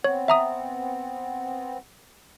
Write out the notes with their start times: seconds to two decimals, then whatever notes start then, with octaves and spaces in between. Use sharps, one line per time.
0.04 B3 C4 C#5
0.28 E5 A#5 D#6